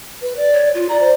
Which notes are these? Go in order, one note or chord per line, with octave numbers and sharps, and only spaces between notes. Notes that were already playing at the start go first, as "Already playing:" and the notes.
B4
D5
C#5
F4
D5 A#5
C5